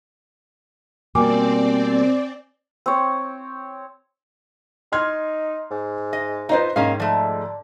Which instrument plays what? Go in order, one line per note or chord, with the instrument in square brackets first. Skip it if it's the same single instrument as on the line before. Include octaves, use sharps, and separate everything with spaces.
[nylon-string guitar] B2 G3 A#3 [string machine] C4 D5 [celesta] G#5 D6
[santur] C4 C#5
[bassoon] D#4 [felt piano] C6 F6 G#6
[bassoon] G#2
[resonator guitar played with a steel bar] D#5
[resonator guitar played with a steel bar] D#4 F4 [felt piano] B4 C5 D#5
[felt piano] G#2 [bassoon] D#3 [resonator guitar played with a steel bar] A#3 C#4 F5
[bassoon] D3 [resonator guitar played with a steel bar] F3 A3